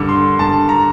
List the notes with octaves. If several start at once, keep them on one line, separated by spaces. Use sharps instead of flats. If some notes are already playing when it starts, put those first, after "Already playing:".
Already playing: G2 D3 D6
C6
G2 A5
A#5